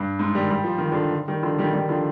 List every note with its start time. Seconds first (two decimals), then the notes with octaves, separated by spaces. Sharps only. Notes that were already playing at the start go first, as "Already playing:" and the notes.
Already playing: G2
0.19 G#2
0.35 D#3 G3
0.50 G3
0.64 F3
0.78 D#3
0.92 D3 F3
1.28 D#3 G3
1.43 D3 F3
1.59 D#3 G3
1.74 D#3 G3
1.89 D3 F3